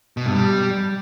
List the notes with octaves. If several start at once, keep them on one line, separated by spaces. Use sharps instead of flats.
B2
G2
G3